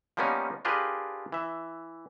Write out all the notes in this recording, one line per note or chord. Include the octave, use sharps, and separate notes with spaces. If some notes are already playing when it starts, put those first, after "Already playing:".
F3 G3 A#3 B3 C#4 D#4
D4 F4 G4 G#4 A#4 B4
E3 E5